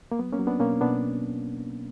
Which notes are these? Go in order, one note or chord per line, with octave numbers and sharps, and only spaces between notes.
A#3
F#3 B3
A#3 C#4
F#3
B3 D4
B2 A#3 C#4
B2 B3 D4